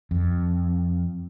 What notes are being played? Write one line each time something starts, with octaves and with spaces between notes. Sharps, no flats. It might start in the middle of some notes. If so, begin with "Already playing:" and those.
F2